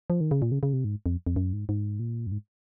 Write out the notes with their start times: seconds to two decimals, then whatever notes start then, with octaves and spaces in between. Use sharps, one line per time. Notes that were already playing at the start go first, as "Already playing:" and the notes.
0.10 F3
0.21 D#3
0.31 C#3
0.42 A#2
0.52 C#3
0.63 C#3
0.73 C3
0.85 G#2
1.06 F2
1.27 F2
1.36 F#2
1.53 G#2
1.69 G#2
2.00 A#2
2.27 F#2
2.32 G#2